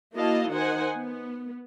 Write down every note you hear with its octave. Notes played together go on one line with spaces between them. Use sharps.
A#3 E4 F#4 D#5 F5 A5
D#3 D#4 C5 F#5 G#5
B3